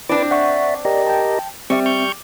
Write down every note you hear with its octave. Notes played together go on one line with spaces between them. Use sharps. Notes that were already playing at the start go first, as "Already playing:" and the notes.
C4 D4 E4 B4 D5 D6
D5 E5 F#5 C#6
G4 A#4 D5 D#5
G5 A5
G3 C4 E5 C#6
C#6 F6 G6